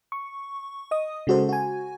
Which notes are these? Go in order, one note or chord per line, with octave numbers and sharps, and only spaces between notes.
C#6
D#5 D#6
C#3 G#3 F#4 A4 C5
F#4 G#5